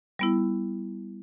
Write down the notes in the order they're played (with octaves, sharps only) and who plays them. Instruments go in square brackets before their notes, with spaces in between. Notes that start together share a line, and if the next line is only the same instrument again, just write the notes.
[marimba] G3 B3 E4